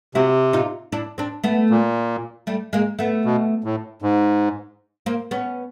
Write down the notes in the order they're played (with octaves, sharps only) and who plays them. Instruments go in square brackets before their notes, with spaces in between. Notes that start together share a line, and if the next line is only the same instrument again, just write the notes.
[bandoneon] C3 [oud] E4 F#4
[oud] D#4 F4
D4 E4
C4 D4
A3 B3
[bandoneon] A#2
[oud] G3 A3
G#3 A#3
A3 B3
[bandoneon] B2
A2
G#2
[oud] A#3 C4
B3 C#4